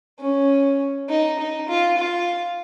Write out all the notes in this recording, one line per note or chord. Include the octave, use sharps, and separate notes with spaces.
C#4
D#4
D#4
F4
F4